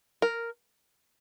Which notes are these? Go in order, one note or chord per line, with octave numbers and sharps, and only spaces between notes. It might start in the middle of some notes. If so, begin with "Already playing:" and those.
A#4